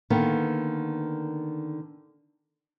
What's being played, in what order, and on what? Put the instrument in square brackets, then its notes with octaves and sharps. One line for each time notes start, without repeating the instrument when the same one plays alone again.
[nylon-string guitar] D3 D#3 A#3 B3